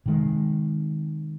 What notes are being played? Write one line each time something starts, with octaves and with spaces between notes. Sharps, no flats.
C3 D#3 G#3